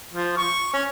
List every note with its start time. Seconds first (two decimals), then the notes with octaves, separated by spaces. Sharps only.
0.13 F3
0.38 C#6
0.74 C#4